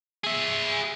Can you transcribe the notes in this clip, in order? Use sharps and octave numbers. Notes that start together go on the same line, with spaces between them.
G#4 E5